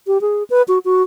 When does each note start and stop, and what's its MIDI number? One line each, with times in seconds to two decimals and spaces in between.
0.07 0.21 67
0.21 0.43 68
0.50 0.62 71
0.68 0.78 66
0.85 1.03 66